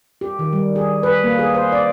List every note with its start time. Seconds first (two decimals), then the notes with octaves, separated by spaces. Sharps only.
0.21 G4
0.39 D#3
0.53 G3
0.76 G#4
1.03 B4
1.24 A#3
1.39 G#4
1.55 C5
1.72 D5